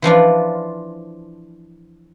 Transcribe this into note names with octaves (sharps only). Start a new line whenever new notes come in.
E3 F3 D4 F4